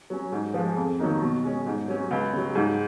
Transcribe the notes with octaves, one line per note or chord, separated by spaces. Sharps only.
F#3 C#4
G#2
F3 G#3
F2
D#3 F#3 A#3 D#4
B2
G#3 C#4
G#2
F#3 C#4
C#2
C#3 F#3
G#2